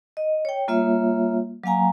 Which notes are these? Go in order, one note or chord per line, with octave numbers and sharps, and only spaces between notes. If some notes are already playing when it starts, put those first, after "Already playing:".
D#5
C#5 G5
G3 A#3 F4 C#5 E5
F#3 A#3 F5 G#5 A#5